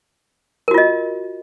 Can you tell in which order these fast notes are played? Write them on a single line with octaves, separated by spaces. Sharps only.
A#4 F#4 F4 D#5